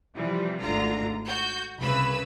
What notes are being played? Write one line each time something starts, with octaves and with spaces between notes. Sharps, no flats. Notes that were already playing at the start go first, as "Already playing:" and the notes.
C3 E3 F3 G3
G#1 D2 D3 F4 A#5
F#4 G6
C2 C#3 B4 B5 E6